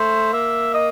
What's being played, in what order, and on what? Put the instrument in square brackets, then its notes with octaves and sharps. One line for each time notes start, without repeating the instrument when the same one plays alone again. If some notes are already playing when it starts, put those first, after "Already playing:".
Already playing: [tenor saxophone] A3 [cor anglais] C5
[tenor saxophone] A#3 [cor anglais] E5
[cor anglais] D#5